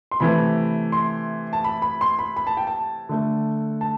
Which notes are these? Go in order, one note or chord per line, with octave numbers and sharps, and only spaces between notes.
C6
C3 E3 A3 B5
C6
A5
B5
B5
C6
B5
B5
A5
G5
A5
D3 A3
A5